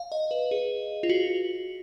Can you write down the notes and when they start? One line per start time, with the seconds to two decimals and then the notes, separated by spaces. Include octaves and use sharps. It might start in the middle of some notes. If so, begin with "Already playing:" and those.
Already playing: F5
0.12 D#5
0.31 B4
0.51 G#4
1.03 F4
1.09 F#4